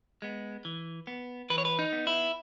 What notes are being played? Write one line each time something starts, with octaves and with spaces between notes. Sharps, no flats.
G#3 B3
E3
B3
E3 B4
C#5
B4
D#4
B3
E4